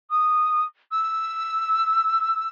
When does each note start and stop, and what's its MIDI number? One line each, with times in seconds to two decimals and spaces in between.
0.10 0.64 87
0.91 2.49 88